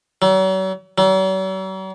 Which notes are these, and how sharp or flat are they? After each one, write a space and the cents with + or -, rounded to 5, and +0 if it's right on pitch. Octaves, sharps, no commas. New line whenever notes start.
F#3 +40
F#3 +45